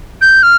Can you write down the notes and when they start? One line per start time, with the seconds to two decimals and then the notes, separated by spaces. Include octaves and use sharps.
0.22 G6
0.43 F6